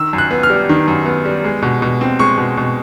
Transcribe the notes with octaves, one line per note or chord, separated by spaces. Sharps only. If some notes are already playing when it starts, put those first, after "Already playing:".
Already playing: D#3 E6
F#2
F#6
B3
F6
G3
D#3
F#2
B3
G3
G#3
B2
B2
C4
G#3 C#6
B2
B2